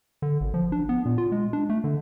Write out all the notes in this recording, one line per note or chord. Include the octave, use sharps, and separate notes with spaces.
D3
G#1
F3
D4
B3
A#2
F4
G#3
D4
A3
D3